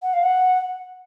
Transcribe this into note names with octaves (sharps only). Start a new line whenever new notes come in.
F#5
F5
F#5